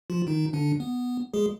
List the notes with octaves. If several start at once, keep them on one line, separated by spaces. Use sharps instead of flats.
F3 F4
D#3 D#4
D3 D4
B3
G#3 G#4